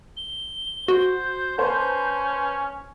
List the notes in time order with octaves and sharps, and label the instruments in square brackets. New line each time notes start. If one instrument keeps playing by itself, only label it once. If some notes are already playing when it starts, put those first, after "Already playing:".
[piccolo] G7
[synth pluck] F#4 [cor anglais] C5
[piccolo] G6
[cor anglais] C#4 [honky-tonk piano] B4 C5 A5